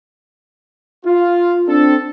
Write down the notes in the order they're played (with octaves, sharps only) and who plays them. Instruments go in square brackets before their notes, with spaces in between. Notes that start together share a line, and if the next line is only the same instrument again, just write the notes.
[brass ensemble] F4
C4 D4 A4